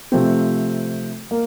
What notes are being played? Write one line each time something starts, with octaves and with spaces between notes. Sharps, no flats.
C3 F3 A3 C4
A#3